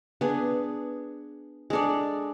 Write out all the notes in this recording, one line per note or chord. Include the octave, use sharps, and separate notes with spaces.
B3 D4 G#4
G#3 D4 A4 D5